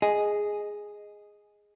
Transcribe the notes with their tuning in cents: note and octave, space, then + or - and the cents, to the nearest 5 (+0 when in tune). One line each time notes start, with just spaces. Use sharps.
G#4 +0 D#5 +0